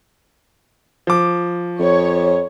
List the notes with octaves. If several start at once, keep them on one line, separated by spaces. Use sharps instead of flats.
F3 D6
F2 C#5